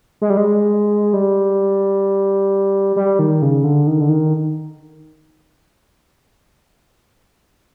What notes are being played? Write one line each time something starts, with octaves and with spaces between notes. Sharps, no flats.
G#3
G3
G#3
G3
G3
D#3
C#3
D3
D#3
D3
D#3